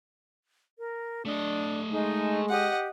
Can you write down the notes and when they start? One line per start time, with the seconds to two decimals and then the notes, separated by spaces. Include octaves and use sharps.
0.78 A#4
1.25 A3 D4 D#5
1.91 G#3 D#4
2.49 G4 D#5 F#5